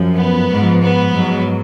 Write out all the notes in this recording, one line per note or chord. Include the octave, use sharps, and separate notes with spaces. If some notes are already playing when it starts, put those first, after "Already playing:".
Already playing: F#2 F3
B3
G#2 F3
B3
G#2 F#3